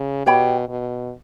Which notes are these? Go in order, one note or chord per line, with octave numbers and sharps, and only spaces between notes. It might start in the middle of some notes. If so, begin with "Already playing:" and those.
Already playing: C#3
B2 G4 C#5 G5 B5
B2